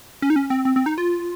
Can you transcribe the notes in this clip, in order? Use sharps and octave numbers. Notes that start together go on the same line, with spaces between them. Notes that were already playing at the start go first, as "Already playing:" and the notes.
C#4
D#4
C#4
C4
C4
C4
D#4
F4